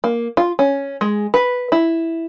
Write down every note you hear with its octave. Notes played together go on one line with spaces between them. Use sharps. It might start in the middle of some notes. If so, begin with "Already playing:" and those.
A#3
F4
C#4
G#3
B4
E4